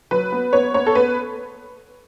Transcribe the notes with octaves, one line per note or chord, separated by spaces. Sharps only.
F#3 B4
B3
B3 C#5
B3 C#5
A4
B3 B4